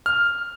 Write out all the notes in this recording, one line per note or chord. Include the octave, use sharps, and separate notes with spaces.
F6